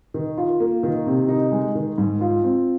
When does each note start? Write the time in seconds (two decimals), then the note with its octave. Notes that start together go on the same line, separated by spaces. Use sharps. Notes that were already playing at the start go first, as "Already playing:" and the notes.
0.14 D#3
0.37 F4
0.60 A#3
0.83 D#3
1.06 C3
1.28 D#4
1.52 G#3
1.75 D#3
1.98 G#2
2.21 F4
2.44 C4